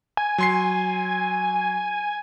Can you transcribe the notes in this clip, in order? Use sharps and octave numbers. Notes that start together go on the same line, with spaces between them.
G#5
F#3 C6 C7